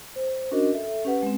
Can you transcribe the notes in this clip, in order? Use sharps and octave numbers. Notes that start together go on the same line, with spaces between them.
C5
C#4 D4 F#4 A#4 D#5
A4 E5
C#4 G4 B4 F#5
G#3 C4